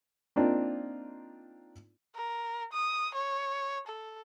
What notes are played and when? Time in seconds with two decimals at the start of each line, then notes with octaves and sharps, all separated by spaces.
0.36 A#3 C4 D4 D#4 F4
2.15 A#4
2.73 D#6
3.15 C#5
3.87 A4